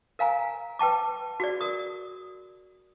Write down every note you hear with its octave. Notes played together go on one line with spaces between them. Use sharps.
A#4 F5 G#5 A#5
B4 G5 A5 D6
F#4 G#4 D5
A#4 D#6